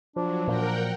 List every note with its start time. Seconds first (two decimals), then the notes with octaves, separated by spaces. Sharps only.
0.16 F3 F#3 D4
0.48 A#2 A#4 F#5 G5